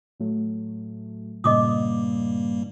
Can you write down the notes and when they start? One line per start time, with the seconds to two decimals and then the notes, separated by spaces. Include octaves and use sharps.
0.19 A2 F#3 A3
1.44 G2 A#2 C#3 G3 A#3 D#5 D6 D#6